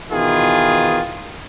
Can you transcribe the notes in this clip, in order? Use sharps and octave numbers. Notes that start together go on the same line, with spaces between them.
B2 D#3 E3 F4 G#4